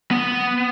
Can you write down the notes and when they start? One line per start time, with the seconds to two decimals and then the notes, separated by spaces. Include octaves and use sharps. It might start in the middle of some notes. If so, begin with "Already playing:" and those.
0.11 B3